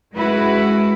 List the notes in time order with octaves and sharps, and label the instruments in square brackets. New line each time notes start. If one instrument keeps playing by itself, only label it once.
[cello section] F#2 G#3 E4 F#4 B4